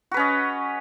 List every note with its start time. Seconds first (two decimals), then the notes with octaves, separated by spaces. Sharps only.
0.11 F#4
0.14 B4
0.17 C#4
0.19 D#5